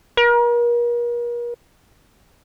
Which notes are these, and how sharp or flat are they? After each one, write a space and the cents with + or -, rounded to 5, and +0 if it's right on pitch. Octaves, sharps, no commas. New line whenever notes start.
A#4 +40